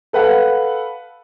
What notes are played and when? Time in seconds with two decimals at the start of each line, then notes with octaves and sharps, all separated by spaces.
0.13 A4 B4 F5 F#5